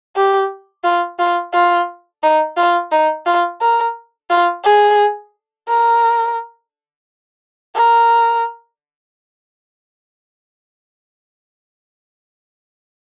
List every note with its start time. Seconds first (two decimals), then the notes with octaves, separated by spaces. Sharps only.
0.16 G4
0.84 F4
1.19 F4
1.54 F4
2.23 D#4
2.57 F4
2.92 D#4
3.26 F4
3.61 A#4
4.30 F4
4.65 G#4
5.69 A#4
7.76 A#4